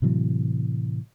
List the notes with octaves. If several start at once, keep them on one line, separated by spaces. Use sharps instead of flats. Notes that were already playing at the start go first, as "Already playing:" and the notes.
A2 C3 E3 F#3